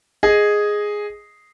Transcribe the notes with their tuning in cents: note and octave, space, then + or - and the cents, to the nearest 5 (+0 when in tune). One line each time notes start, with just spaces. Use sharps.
G#4 +0 D#5 +0